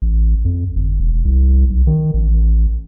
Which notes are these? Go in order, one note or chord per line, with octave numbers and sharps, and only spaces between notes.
A1
F2
G1
E1
C2
B1
D#3
A1